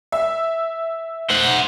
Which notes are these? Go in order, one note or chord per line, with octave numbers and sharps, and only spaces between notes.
E5
C5 F#5